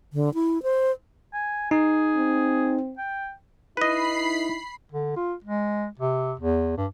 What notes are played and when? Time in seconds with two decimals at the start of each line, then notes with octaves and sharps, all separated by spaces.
0.13 D3
0.34 E4
0.63 C5
1.33 G#5
1.71 D#4 G#4
2.16 C4
2.98 G5
3.77 D#4 E4 B4 D#5 B5 C7
4.92 D3
5.16 F4
5.44 G#3
5.99 C3
6.39 E2
6.77 G2